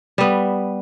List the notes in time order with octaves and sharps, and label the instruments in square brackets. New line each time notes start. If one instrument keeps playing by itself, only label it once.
[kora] G3 B3